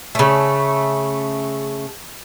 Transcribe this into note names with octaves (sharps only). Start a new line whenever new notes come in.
C#3 A3